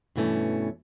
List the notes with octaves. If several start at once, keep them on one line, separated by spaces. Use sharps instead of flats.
G2 B2 E3 A3 C#4